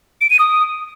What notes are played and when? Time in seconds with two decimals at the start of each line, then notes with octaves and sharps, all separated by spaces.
0.21 D7
0.30 D#7
0.39 D#6